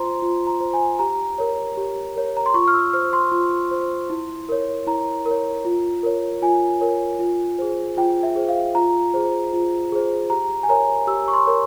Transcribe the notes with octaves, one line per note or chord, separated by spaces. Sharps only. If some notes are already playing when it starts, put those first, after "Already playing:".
Already playing: F4 C5 A#5 C6
F4
A#5
C5
G#5
G4 A#5
A#4 C#5
G4
A#4 C#5
A#5
C6
F4 C#6
F6
E6
C5 F6
C6
F4
C5
E4
A#4 C#5
E4 A#5
A#4
C#5
F4
A#4 C#5
F4 G#5
A#4 C#5
F4
G#4 C5
F4 G5
E5
G#4 C5
F5
F4 A#5
G#4 C5
F4
G#4 C5
G4 A#5
G#5
A#4 C#5 A#5
G4 E6
C#6
C6
A#4 C#5